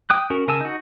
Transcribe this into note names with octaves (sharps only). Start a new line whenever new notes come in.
G5 D#6 F#6
C#4 F#4 A#4
C#3 A#4 G#5 A5 E6
D#4 F#4